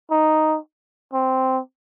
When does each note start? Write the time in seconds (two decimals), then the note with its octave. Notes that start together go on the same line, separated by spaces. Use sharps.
0.11 D#4
1.14 C4